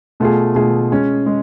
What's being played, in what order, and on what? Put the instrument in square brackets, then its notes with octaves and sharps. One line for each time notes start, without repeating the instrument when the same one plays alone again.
[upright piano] B2 A3 F4 G#4
B2 A3 F4 G#4
G#3 C#4 G#4
G#3